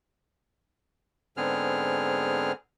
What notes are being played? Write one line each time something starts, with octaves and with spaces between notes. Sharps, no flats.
G#2 D3 B3 C4 G#4 F6